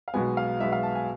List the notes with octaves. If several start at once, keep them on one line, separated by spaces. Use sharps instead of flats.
F5
B1 B2 G#3 B3 G#5
F5
B1 B2 G#3 B3 E5
F5
A5
G#5